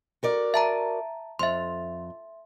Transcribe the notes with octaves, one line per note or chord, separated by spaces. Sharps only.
F#4 A#4 D5
E5 A5 A#5
F2 E5 C6